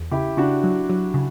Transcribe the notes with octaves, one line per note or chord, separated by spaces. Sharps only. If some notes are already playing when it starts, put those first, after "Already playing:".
Already playing: E2
C#3 E4 G4
C#3 D4 F#4
F#3
F#3
C#3